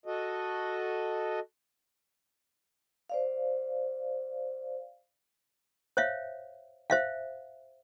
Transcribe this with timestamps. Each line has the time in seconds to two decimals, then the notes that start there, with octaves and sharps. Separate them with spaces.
0.06 F#4 A4 D#5
3.10 C5 D5 F5
5.97 C5 C#5 E5 F5
6.90 C5 E5 F5